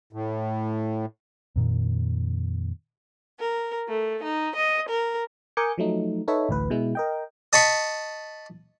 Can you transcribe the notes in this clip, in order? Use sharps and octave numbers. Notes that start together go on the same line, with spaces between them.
A2
F2 A#2 D#3
A#4
A3
D#4
D#5
A#4
A#4 G#5 D6 D#6 G6 C#7
F3 F#3 A3 D#4
D#4 A4 B4 C#5 E5
A1 D2 A2 B4
B2 G#3 E4
A#4 D#5 G5
D#5 A5 B5 C#6